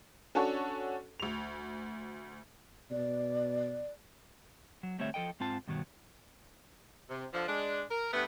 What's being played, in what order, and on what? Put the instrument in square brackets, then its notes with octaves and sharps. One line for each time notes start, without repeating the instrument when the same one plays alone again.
[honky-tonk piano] C#4 D4 F#4 A4 C#5
D2 F7
[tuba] B2 [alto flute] D5
[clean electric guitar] F#3
D2 G3 A3 C4 C#5 E5
F3 A4 D#5 G5
G#2 C4 F4 A5
G2 B2 D#3 F3 F#3
[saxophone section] C3
D3 F3
G#3 D4
A#4
G2 A3 B3